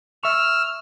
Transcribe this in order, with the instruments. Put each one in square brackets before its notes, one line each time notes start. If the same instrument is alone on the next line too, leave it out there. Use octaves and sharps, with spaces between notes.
[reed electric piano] E5 C#6 [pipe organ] E6 F6